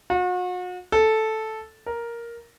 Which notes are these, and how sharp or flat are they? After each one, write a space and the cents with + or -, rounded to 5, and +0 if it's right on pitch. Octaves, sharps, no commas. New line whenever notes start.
F#4 -40
A4 -5
A#4 +5